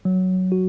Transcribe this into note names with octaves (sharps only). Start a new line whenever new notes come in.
F#3
F#4